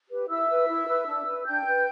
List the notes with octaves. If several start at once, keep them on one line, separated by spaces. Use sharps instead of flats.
G4 B4
E4 E5 E6
B4
E4
B4
D4
B4
D4 G5 G6
B4